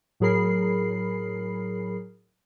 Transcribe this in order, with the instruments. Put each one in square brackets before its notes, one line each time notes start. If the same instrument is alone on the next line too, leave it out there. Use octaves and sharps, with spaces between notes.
[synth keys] A2 F#3 G#4 A#4 B5 C7